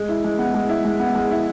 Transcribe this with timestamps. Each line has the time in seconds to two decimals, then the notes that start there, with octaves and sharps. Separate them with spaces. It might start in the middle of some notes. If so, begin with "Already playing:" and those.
Already playing: G#3
0.09 E4
0.24 G#3
0.39 B3
0.54 G#3
0.69 E4
0.85 G#3
1.00 B3
1.15 G#3
1.31 E4